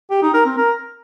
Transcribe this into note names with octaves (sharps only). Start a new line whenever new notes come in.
G4
D#4
A#4
C4
A#4